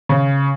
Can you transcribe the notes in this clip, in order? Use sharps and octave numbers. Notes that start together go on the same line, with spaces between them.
C#3